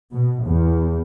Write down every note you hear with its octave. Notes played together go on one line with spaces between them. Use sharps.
B2
E2